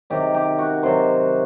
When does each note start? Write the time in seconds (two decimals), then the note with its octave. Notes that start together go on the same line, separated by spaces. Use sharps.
0.10 C3 D#3 F#3 G4
0.34 G4
0.59 F#4
0.83 C3 D#3 F#3 C5